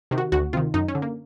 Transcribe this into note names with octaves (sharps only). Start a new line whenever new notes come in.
C3 D#3
F#4
D2 F#4
C3 D#3 F4
F#2 D#4
C#4
D3
A#3